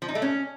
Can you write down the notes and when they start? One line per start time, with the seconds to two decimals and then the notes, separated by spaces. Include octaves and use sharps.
0.02 F3
0.09 D#4
0.15 A3
0.22 C#4